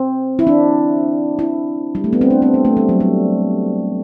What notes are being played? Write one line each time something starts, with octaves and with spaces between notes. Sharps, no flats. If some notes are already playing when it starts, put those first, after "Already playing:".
Already playing: C4
E4
D4
E4
G3
A3
B3
C4
D4
C4
B3
A3
G3
F#3
G3